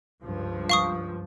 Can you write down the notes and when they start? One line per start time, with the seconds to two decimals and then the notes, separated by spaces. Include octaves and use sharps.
0.22 C#2 G2 F3
0.70 F5 C#6 D#6